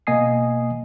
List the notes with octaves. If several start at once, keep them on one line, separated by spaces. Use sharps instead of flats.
B2 A#3 D#5 G#5 D#6 C7